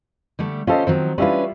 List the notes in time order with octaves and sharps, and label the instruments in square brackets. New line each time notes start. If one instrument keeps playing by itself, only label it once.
[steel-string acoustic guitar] D3 G3 A3
[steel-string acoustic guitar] C#4 G4 C5 [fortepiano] F4 A4 D#5
[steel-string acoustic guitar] D#3 F3 F#3 [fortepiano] C4
[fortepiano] G3 E4 F4 [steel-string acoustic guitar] C#4 D4 B4